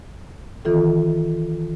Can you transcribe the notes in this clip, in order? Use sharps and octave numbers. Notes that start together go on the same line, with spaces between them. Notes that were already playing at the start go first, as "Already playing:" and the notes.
D#3 E3 F4 A4